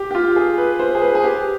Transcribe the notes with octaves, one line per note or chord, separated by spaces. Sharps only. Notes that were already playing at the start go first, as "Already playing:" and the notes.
Already playing: G4
G4
F4
G#4
B4
C5
G#4
B4
G#4
G4